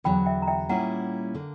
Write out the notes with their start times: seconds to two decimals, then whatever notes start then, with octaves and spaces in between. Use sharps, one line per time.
0.04 E2 D3 F#3 G5 B5
0.26 E5 G5
0.42 A#5
0.47 E5 G5
0.69 A#2 G3 C#4 E4 F#5 A#5
1.35 D3 A#3